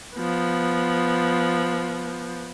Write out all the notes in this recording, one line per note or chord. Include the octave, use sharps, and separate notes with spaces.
F3 B3